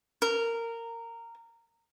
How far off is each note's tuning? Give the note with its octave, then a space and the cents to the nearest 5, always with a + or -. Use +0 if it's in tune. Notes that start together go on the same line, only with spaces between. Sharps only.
A#4 -15